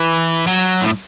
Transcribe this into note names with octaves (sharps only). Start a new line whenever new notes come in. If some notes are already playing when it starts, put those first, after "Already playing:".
Already playing: E3
F#3
A2